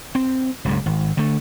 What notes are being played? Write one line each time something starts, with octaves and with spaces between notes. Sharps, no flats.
C4
F#1 C#2 G2
G#1
D3 A3